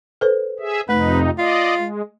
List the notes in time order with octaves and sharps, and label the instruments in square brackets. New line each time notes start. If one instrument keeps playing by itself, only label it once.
[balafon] A4 B4 C5
[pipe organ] G#4 E5
[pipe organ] F2 C3 D#4 [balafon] A3 [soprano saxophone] B4
[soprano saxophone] F4 [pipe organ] D5 D#5
[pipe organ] G#3